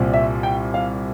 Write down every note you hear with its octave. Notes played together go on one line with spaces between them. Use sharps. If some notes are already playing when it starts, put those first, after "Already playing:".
Already playing: C2 A#2 G3 C4
E5
G5
F5